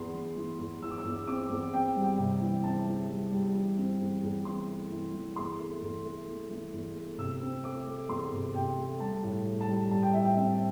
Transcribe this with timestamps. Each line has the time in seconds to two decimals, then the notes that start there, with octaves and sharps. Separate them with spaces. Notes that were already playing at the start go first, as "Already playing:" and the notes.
Already playing: E2 C6
0.14 E3
0.37 E3
0.59 E2
0.82 E3 E6
0.90 D6
0.98 E6
1.05 E2
1.27 C4 D6
1.50 E2
1.73 C4 G5
1.96 G3
2.03 G5
2.18 C3
2.41 E3
2.63 C4 A5
2.87 E3
3.09 G3
3.32 G3
3.54 E3
3.78 C4
4.00 E2
4.23 E2
4.45 E3 C6
4.68 A3
4.91 E3
5.14 E3
5.36 E2 C6
5.59 A3
5.81 E2
6.05 A3
6.28 E3
6.50 E3
6.73 E2
6.96 A3
7.18 C3 E6
7.41 C4
7.64 A3 D6
7.87 A3
8.09 E2 C6
8.32 C3
8.55 C3 G5
8.78 A3
9.00 G3 A5
9.23 A2
9.45 A2
9.61 A5
9.68 G3
9.91 G3 A5
10.02 G5
10.13 A2 E5
10.25 G5
10.36 C4 E5